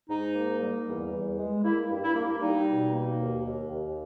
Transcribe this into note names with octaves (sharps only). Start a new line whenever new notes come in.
G#2 D#4
A#3
G3
E2
E2
G#3
A#3 E4
G2
E4
A#3
G3 D#4
B2
A#3
D#2
D#2
D#2